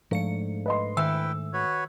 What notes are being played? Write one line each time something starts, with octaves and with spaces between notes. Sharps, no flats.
G#2 F3 A3 D4 F5 C#7
B4 D#5 C6
D#3 E4 B4 E5 G5 E6
F#4 B4 C#5